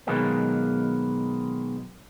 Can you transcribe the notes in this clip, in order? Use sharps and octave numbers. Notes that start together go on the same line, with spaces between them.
B2 D#3 F#3 G#3 A#3 B3